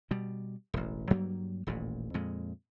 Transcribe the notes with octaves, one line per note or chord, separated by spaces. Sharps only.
B2 G3
E1 A1
G2 F#3 G3 A#3
D#1 A1 A#2
F2 A#2 G#3